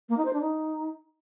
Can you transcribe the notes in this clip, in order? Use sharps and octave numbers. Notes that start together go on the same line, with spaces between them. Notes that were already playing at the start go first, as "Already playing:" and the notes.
A#3
D#4
C5
D4
D#4